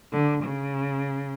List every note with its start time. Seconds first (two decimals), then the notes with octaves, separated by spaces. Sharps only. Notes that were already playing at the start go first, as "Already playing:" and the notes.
0.12 D3
0.43 C#3